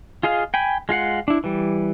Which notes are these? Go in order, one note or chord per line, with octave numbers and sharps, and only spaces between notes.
F4 G#4 D#5 F5
G5 G#5 B5
G#3 F4 F5 F#5
D4 E4
E3 G3